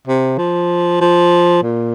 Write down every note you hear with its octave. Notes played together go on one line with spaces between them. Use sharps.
C3
F3
F3
A#2